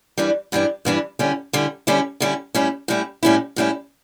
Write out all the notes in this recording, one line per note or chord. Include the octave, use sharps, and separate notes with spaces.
G2 E3 G3 D4
G2 E3 G3 D4
G2 E3 G3 D4
D3 G3 C#4 E4
D3 G3 C#4 E4
D3 G3 C#4 E4
D3 G3 C#4 E4
A2 G3 C#4 E4
A2 G3 C#4 E4
A2 G3 C#4 E4
A2 G3 C#4 E4